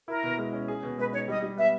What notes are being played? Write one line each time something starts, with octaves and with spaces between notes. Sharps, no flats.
E4 A#4
B2
G#3
C#4
G#4
B2
G#3 B4
D#4 C#5
G3 D#5
G3
B3 E5